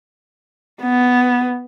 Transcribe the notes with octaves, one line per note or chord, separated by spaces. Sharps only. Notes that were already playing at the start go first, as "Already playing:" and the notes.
B3